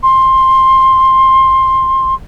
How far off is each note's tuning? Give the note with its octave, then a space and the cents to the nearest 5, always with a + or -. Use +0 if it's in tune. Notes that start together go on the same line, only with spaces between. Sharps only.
C6 +15